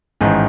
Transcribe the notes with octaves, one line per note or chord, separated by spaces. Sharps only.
A1 G#2 D#3